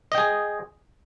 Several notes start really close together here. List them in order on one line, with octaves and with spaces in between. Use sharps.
D#5 G5 G#4